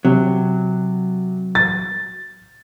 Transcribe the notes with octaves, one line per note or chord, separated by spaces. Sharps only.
C3 F#3
A6